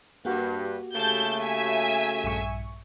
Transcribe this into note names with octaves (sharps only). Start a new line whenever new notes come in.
G2 A#3 F#4 G4
C#3 A3 A5 G6
E5 G#5
A#1 G2 C#6